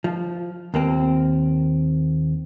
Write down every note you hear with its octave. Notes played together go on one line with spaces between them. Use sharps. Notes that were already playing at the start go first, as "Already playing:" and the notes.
F3
D#2 A#3 C4